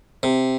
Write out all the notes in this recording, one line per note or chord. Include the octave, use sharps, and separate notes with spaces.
C3